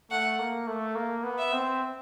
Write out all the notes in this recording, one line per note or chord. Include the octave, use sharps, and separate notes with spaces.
A3 F#5
A#3
A3
A#3
B3
E5
C4